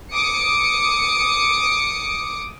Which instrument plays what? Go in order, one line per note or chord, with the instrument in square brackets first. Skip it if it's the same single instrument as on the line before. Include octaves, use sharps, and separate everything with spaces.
[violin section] D6 D#6 C#7